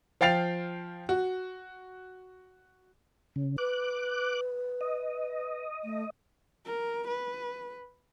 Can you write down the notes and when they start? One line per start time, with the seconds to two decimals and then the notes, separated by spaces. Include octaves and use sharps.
0.21 F3 F5 G5 A6 C7 F7
1.09 F#4
3.36 C#3
3.58 B4 D6 F#6
4.81 D#5
5.84 A3
6.65 A#4
7.07 B4